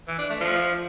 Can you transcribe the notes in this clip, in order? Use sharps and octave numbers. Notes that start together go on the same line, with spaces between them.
E3
D4
A3
F3